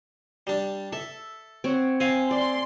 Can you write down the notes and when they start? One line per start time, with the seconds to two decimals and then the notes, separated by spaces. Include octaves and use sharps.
0.47 G3 D4
0.93 A4 E5
1.64 C4 C#5 F#5
2.00 C4 F5 G#5
2.31 D5 C6